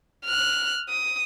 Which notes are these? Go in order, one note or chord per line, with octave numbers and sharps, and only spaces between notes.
F6 F#6
D#6